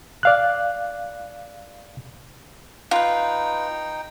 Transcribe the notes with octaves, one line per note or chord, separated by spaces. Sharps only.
D5 F5 F#6
D#4 F4 B4 G5